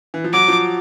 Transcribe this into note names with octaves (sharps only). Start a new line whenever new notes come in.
E3
F3
F#3 D6
F3